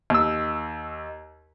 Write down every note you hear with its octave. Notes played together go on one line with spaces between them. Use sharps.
D#2 E6